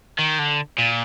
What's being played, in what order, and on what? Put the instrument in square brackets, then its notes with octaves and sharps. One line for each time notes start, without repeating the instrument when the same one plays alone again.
[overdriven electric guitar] D#3
D3
A#2